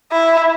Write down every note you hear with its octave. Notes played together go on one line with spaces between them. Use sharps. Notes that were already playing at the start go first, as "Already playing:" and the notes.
E4